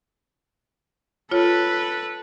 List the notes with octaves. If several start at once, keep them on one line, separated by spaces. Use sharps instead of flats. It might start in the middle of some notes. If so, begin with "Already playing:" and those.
F4 A4 B4 C#5